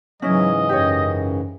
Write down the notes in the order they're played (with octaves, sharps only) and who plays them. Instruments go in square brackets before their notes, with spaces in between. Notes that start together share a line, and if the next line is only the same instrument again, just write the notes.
[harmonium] G#2 C#3 E3 [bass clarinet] F#3 [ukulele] C#4 E4 [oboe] D#5
[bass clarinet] F#2 [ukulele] G4 C#5